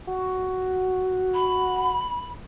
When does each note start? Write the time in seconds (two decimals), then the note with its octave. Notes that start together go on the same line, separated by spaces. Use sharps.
0.07 F#4
1.34 B5